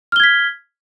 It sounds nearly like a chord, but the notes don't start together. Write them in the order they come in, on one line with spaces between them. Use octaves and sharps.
F6 G7 G#6 B6